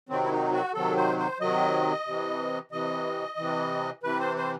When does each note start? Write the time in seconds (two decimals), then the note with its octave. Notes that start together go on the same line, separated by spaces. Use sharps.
0.09 C3 D#3 F#3 C4
0.24 E4
0.31 D#4
0.52 F#4
0.74 C3 D#3 F#3 A4
0.96 C5
1.18 C5
1.40 C3 D#3 F#3 D#5
2.07 C3 E3
2.72 C3 E3 D#5
3.38 C3 E3
4.03 C3 E3 B4
4.19 C5
4.37 C5